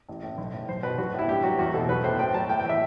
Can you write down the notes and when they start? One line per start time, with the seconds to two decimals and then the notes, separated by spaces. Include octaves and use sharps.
0.09 A1
0.23 A2
0.38 B1
0.54 A2
0.69 B1 C5
0.83 B2 B4
0.98 B1 F#4
1.14 A2 E4
1.28 G2 G4
1.43 F#3 F#4
1.58 E2 F#4
1.74 B2 A4
1.88 B1 B4
2.04 A2 C5
2.19 A2 G5
2.34 F#3 A5
2.49 A2 G5
2.60 G5
2.64 E3
2.69 E5